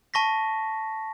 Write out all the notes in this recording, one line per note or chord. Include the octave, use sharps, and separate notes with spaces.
A5 C#6 A#6 B6